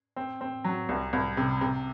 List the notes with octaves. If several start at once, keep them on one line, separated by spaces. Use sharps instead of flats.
C4
C4
F#3
C2
C2
C3
C3